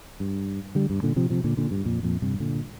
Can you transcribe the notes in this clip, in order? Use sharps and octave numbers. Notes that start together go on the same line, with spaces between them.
G2
D3 G3
G2
A#2 D3
C3 F3
C3 F3
A#2 D3
A#2 D3
G2
F2 A#2
F2 A#2
G2 C3
A#2 D3